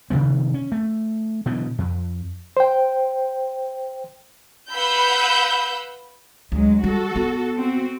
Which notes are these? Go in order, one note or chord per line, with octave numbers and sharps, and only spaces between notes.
C3 D#3 F3 B3
C#4
A3
B2 D3 E3 F#3
F2
C5 G5
B4 F5 F#5 B5 E6 G6
D2 F#3 G#3
G3 F#4 A4
B3
C4 F#4